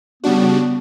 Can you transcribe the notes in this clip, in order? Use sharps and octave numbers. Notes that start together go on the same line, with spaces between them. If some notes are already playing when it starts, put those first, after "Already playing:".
C#3 G3 B3 D4 F#4